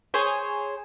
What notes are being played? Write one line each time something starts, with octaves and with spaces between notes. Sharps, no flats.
G#4 C5 C#5 G#5